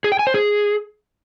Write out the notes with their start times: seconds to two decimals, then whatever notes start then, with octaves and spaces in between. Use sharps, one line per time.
0.04 G#4
0.12 G5
0.19 G#5
0.27 C5
0.34 G#4